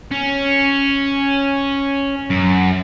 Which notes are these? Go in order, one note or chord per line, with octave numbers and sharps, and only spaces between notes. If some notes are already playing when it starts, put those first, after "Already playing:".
C#4
F#2